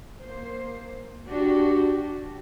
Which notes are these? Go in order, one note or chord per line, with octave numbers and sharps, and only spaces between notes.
A#3 C5
D4 F#4 G4